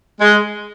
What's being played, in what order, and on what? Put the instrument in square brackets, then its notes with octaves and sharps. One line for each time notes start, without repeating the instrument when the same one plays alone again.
[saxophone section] G#3